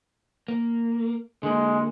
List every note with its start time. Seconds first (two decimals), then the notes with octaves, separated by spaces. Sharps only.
0.48 A#3
1.43 D3 G#3 A#3